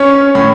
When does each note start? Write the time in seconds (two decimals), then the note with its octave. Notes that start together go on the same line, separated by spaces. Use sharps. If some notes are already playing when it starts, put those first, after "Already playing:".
Already playing: C#4 C#5
0.35 A2